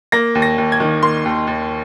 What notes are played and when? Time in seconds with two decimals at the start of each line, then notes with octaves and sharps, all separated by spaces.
0.12 A#3 A#6
0.35 D#2
0.42 A#6
0.58 D#2
0.72 G#6
0.80 D#3
1.03 A#3 C6
1.25 D#2
1.47 D#2